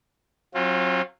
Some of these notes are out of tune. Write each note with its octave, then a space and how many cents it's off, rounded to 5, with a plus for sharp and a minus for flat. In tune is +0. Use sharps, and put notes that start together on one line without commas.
F#3 -10 C4 +40 F4 +0